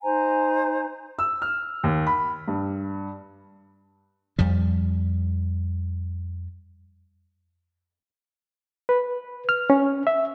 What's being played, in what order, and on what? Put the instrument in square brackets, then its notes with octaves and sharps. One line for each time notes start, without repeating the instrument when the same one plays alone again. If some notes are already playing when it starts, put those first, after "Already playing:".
[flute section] D#4 C5 G#5 A#5
[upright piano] E6
F6
D#2
B5
G2
[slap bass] F2 F3 G3
[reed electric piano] B4
F6
C#4
E5